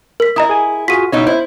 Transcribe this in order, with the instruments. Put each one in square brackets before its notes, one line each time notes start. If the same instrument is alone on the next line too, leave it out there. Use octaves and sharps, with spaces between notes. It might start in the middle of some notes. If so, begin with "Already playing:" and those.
[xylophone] A#4 B6
[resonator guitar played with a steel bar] E4 [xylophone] D#5 A#5 D#6
[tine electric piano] G#4 G#5
[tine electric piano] F4 F#4 G#4 [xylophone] B6 D#7
[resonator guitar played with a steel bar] B2 D#4 E4 [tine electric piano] C#5 E5
[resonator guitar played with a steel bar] E4 [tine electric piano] C5